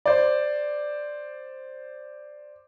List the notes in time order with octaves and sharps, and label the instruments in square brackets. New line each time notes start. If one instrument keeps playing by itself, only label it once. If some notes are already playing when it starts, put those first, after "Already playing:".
[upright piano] C5 D5